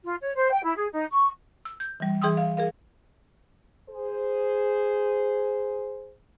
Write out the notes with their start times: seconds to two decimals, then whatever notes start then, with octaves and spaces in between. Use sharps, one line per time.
0.04 F4
0.21 C#5
0.36 C5
0.52 G5
0.63 E4
0.76 G#4
0.93 D#4
1.12 C#6
1.65 E6
1.80 G6
2.00 E3 G3
2.22 E3 G#4 G5 C6 D#6 E6
2.37 F5
2.57 G#4 A#4 F5
3.90 G#4 C5